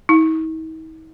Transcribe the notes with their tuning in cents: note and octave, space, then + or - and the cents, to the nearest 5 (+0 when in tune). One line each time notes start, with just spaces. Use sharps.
D#4 +45